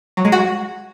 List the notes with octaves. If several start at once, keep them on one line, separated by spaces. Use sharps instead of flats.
F#3
G#3
F#4